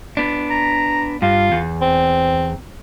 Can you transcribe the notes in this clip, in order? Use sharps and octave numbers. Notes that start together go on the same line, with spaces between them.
B3 D4
A#5
G2 F4
E2
C4